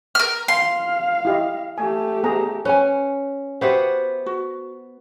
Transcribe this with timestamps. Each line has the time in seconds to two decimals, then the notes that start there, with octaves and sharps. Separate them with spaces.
0.15 A#4 F6
0.48 F5 C6
1.25 E4 G4 D#5
1.78 A3 G4 G#5
2.23 B3 G#4 A#5
2.65 C#4 B4 G#5
3.61 B3 F#4 G4 C5 E5 F#5
4.26 F#4